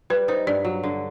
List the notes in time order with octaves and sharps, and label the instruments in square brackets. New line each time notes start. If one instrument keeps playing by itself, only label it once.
[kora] G3 [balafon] B4
[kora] D#4 [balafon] C5
[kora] G2 [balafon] D5
[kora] F#3
D3